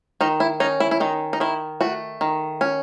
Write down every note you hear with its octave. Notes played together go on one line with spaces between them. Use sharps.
D#3 D#4
E4
C#4 D#4
E4
E4
D#3 D#4
D#4
D#3 E4
A3 F#4
D#3
C#4